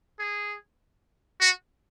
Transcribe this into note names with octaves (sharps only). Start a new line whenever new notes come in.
G#4
F#4